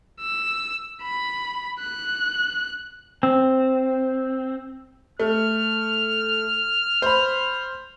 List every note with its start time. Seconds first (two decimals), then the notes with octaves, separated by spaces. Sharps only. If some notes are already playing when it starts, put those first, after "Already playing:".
0.20 E6
1.03 B5
1.80 F#6
3.23 C4
5.20 A3 F6
7.02 C5 B5